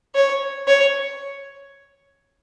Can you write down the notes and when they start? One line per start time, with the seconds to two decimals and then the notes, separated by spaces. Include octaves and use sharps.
0.15 C#5
0.67 C#5